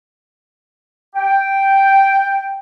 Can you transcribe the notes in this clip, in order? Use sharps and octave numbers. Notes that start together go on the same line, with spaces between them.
G5